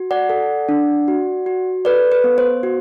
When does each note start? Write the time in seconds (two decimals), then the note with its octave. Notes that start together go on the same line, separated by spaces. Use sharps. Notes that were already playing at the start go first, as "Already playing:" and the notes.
Already playing: F#4
0.11 D5 F#5
0.29 A4
0.69 D4
1.08 F#4
1.46 F#4
1.85 A4 B4 D5
2.12 B4
2.24 B3
2.38 C5
2.63 F#4